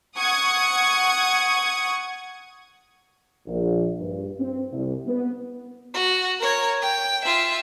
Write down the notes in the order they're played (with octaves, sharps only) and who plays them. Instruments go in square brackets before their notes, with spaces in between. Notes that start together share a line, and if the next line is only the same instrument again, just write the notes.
[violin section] F#5 C#6 D#6 G#6
[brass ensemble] A#1
G2
C4
C2
B3
[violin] F#4
A#4 C#5
G5
F4 E5